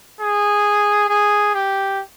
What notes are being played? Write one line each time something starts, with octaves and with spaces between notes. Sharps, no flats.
G#4
G#4
G4